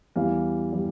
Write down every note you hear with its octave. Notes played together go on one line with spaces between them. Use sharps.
E2 E3 G3 F5
E3 G3